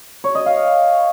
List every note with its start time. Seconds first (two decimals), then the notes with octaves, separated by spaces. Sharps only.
0.24 C#5
0.35 D#5
0.46 F5